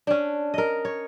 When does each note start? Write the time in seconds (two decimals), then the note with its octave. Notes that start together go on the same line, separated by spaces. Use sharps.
0.07 C#4 D4
0.54 A#4 D#5
0.85 C#5